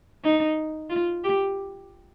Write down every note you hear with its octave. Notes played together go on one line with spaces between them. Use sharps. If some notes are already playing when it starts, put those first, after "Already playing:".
D#4
F4
G4